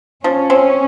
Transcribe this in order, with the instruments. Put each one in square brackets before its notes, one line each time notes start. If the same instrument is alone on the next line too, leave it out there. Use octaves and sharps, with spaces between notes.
[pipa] F3 [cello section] C#4
[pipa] C4